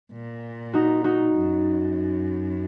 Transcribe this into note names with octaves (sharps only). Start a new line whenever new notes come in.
A#2
D#4 F#4
D#4 F#4
F#2